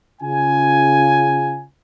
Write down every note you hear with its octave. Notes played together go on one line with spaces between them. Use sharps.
C#3 F4 G#5